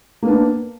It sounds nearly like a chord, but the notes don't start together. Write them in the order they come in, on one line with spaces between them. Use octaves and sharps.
A#3 B3 D4